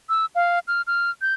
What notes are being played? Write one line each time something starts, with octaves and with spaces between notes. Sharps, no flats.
E6
F5
F6
F6
G6